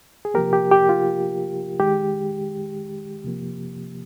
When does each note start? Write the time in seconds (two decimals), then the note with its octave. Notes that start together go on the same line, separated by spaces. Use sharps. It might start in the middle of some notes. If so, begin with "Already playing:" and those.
0.25 G#4
0.34 C3 F3 A#3 G4 A#4
0.53 G4
0.71 G4
0.89 F4
1.80 D#3 G#3 G4
3.24 C3 F3 A#3